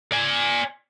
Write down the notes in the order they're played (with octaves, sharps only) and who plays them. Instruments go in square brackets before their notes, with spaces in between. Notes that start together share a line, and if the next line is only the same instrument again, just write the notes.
[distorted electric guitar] D5 G#5